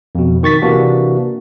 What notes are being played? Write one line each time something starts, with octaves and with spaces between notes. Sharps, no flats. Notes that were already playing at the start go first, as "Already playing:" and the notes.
F2 B2
D#3 C#6 A6 B6
C3 E3 A#3 D4 F#4